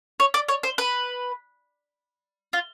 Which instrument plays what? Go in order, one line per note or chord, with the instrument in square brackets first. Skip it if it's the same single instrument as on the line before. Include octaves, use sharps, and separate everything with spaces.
[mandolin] C#5
D5
C#5
C5
B4
F4